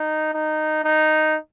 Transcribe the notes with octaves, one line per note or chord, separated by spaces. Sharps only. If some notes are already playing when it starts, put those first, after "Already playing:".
Already playing: D#4
D#4
D#4